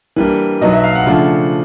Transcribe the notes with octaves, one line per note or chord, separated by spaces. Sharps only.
E3 G3 A#3 D4
B2 F#3 B3 D#4 D#5
E5
F5
F#5
C#3 F3 A3 D4